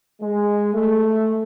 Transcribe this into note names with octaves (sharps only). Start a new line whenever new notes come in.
G#3
A3